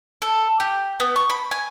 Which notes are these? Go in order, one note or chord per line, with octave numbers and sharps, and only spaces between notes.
A4
G4
B3
C#6
B5
G#5